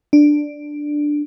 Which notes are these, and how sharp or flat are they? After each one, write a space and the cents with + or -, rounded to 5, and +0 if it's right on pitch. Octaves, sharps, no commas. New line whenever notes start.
D4 +5